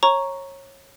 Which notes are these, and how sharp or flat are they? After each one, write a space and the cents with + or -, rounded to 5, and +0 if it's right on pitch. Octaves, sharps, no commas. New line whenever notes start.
C#5 -25 A#5 +0 C#6 +0